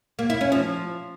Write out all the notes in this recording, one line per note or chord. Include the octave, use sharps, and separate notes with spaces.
A#3
E4
C#4
F3